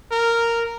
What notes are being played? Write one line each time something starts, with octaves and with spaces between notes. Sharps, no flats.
A#4